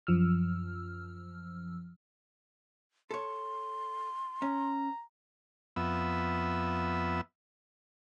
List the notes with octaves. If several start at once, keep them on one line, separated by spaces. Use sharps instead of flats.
F#2 F3 E6 F6
A4 C#5 C6
C#4 A#5
F2 B3 E5